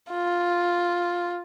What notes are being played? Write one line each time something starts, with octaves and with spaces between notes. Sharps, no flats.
F4